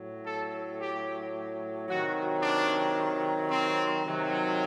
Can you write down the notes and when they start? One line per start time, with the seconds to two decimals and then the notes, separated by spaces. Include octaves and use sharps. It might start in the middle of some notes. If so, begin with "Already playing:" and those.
Already playing: A2 F#3
0.25 A4
0.80 G4
1.88 C3 D#3 F#3 F#4
2.42 D4
3.51 C4
4.06 C3 D#3 F#3